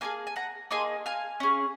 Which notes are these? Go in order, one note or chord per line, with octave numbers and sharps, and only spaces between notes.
A#3 D#4 G#4 F5 G#5
G#5
F#5 A#5
A#3 D#4 G#4 G#5 C6
F5 G#5
C#4 G#4